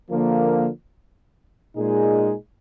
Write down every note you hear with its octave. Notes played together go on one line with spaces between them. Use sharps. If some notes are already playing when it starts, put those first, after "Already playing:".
D3 F3 A#3
A#2 G#3 D#4 G#4